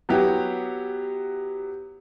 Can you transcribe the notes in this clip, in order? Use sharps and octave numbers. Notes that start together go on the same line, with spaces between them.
F#3 B3 E4 G4